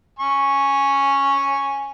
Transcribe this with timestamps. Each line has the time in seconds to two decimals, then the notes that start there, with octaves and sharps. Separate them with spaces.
0.19 G#5 C#6